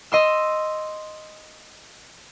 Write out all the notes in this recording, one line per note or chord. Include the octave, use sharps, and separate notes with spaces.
D#5 C6 E6